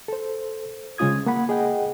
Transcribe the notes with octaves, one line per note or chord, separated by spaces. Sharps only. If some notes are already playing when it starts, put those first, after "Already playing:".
A4 C5
C#3 G#3 C#4 F4 D#6 G#6
A#3 F#5 B5
G#4 D#5 F#5 G5